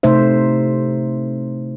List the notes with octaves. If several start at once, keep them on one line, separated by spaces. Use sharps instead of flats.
C3 A3 D#4 C5 E5